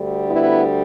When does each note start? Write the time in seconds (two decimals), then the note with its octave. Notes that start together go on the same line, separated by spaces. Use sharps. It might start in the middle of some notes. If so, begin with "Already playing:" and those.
Already playing: D2 D3 G3
0.29 B3 E4